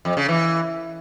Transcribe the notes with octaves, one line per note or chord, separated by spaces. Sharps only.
F2
C#3
E3